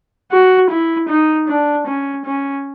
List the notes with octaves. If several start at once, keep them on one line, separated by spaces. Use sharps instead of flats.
F#4
E4
D#4
D4
C#4
C#4